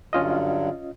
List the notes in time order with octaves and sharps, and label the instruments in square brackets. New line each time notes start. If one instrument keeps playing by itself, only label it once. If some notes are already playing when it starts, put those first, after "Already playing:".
[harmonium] G2 D3 F#3 [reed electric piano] C#4 F4 D#5